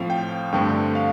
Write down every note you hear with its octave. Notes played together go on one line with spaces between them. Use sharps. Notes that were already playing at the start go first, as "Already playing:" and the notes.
Already playing: A2 F3 C4 F5
G5
G2 D3 A3 C4 G5
F5